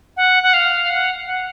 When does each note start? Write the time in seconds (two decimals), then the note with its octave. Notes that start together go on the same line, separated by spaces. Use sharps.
0.17 F#5
0.43 F#5
0.53 F5
0.90 F#5
1.27 F#5